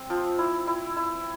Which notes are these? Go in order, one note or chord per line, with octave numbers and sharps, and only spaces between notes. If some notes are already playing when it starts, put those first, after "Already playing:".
Already playing: C4
F3
E4
E4
E4